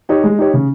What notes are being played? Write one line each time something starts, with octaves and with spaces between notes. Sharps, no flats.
D#4 G4 C#5
G#3
D#4 G4 C#5
C#3